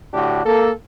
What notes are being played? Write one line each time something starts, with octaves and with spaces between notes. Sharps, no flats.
A2 D3 D4 F#4 G4
A#3 A4